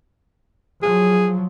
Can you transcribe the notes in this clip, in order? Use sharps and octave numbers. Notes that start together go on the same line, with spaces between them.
F3 F#3 G#4